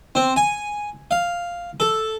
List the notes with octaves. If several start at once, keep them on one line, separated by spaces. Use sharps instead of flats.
C4
G#5
F5
A4